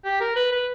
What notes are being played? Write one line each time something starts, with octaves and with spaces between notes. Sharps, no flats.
G4
A#4
B4
B4